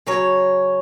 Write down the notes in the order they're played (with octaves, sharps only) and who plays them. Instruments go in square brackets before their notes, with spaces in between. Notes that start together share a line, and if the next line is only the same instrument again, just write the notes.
[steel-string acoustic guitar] C#3 F#3 C#5